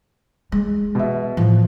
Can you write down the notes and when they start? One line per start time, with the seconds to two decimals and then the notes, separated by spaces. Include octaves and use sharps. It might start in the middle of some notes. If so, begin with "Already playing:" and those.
0.52 G#3
0.95 B2 E5
1.37 A2 F3